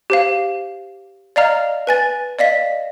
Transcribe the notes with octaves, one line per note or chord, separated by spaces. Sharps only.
G4 C5 F5
D5 D#5 F5 A#5 F6
B4 G#5 A6
D5 D#5 F5 B6